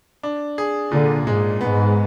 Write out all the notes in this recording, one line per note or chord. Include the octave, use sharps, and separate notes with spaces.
D4
G#4
A#2 D3
G#2 G#3
G#2 B3